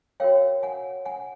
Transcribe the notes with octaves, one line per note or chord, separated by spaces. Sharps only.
F#4 A#4 C#5 F5 G5
F#5 G#5
F#5 G#5